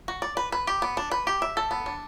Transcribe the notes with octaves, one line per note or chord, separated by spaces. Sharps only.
F#4
D5
B4
B4
G4
B3
D4
B4
G4
E5
A4
B3
D4